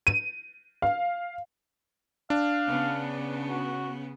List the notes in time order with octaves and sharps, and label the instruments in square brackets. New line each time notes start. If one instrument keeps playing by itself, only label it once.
[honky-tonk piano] D#7
F5
[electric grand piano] D4 [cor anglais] F5
[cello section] C#3 B3
[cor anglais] F#4